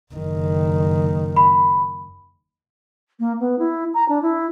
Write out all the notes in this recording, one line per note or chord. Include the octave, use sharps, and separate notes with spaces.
F#1 D#3
B5
A#3
B3
E4
A#5
D4
E4